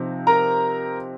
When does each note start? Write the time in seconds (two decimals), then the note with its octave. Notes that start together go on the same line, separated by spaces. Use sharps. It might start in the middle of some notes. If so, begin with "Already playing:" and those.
Already playing: C3 F3 C4 D#4
0.27 A#4 A#5